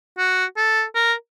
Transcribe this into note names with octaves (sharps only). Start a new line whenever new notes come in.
F#4
A4
A#4